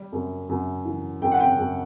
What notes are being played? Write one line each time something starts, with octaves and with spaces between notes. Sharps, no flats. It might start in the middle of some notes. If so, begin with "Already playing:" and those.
Already playing: G3
F#2
F#2
E3
F#2 G5
F#5
G5
F#2